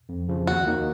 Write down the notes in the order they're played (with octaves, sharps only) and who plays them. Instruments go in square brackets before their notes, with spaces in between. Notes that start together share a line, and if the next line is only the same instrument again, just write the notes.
[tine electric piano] F2
C#3 F3
[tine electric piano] D#2 [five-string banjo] F#4
[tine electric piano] D#3 A#3 D#4